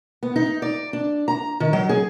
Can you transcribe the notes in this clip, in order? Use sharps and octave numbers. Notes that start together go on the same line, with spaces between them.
B3
D#4
D5
D4
A#5
D#3
F#3
G#4